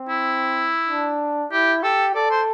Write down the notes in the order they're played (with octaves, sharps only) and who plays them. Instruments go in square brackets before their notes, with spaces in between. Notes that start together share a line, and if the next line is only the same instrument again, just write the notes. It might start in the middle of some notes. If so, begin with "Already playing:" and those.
Already playing: [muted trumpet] C4
[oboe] E4
[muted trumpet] D4
[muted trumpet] E4 [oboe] G4
[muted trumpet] G4 [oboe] A4
[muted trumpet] A4 [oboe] D5
[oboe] C5